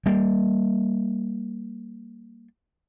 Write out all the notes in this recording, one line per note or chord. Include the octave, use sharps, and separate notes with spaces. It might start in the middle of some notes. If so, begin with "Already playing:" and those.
G3 A#3